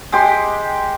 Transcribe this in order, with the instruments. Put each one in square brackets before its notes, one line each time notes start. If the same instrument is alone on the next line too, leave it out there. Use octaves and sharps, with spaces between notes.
[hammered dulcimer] G#3 G4 C6